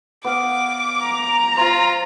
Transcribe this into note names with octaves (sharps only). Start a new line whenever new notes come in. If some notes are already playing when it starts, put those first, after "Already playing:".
B3 F5 D6
A#5
F4 C5